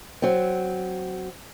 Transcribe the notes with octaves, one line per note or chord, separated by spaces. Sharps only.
F#3 C4